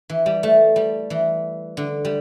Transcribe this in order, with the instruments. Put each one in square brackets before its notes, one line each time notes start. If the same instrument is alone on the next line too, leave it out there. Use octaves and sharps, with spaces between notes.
[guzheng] E3
G3
A3
G3
E3
D3
G3